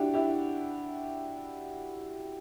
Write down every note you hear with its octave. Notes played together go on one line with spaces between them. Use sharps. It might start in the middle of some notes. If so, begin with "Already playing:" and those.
Already playing: D4 E4 F#4 G4
E4 G4